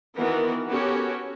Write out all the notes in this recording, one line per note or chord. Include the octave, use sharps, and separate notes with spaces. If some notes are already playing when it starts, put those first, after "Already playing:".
D#3 E3 B3 F#4 A#4
B3 C#4 F#4 G4 A4